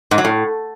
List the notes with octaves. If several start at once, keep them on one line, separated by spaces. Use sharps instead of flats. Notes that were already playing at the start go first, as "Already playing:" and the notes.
G#2
F#3
A2